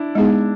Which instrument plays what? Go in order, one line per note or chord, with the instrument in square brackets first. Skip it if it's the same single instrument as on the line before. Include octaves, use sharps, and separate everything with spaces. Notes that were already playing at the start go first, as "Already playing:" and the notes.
Already playing: [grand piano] D4 E4
[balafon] G#3 B3 D#4 G#4